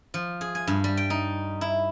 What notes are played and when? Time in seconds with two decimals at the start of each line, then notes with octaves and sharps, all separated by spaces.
0.14 F3
0.41 G#4
0.55 G#5
0.67 G2
0.84 G3
0.97 G5
1.10 D#4
1.61 E4